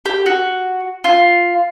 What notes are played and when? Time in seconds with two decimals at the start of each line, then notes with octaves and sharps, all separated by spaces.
0.05 G4
0.26 F#4
1.04 F4